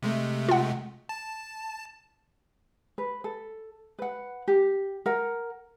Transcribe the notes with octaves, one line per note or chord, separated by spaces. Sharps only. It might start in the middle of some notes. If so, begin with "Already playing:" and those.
C3 G#3 A3
F4 F#5
A5
B4
A4
B4 F#5
G4
A#4 F#5